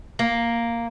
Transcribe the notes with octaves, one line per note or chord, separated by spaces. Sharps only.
A#3